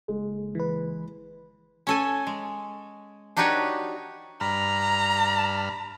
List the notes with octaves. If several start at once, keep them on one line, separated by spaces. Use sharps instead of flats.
F#1 G#3
E3 B4
C#4 A4 G#5
G#3
D4 D#4 F#4 G4 B4 C#5
G2 A#5 B5 F6